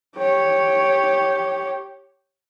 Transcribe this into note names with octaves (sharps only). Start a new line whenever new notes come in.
G4 C#5